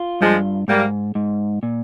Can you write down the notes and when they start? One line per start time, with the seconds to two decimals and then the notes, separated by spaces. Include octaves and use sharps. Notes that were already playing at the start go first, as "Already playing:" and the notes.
Already playing: F4
0.20 G2 F3 G#3
0.67 G#2 G3 A#3
1.15 G#2
1.63 A#2